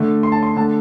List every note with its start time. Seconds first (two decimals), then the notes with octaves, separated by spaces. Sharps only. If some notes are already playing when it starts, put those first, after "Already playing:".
Already playing: D3 A3
0.23 C6
0.32 A5
0.43 C6
0.56 D3 A3 A5